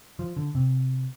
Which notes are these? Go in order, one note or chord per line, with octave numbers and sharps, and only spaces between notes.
F3
D3
C3